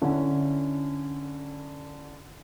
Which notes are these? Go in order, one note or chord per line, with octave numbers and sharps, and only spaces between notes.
D3 C#4 E4